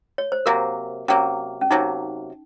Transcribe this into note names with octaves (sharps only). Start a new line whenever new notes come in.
C#5
C5
C3 F#3 A#3 A#4
C3 F#3 A#3 C#4
C#4
C3 F#3 A#3 D#4